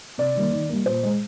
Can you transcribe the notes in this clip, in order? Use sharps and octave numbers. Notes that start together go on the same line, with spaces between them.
C3 D5
D#3 G3 A#3
D#3
G3 A#3
A#2 C5
G#3